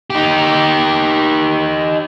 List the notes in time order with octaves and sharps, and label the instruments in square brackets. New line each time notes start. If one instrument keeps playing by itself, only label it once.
[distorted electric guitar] D#4 G4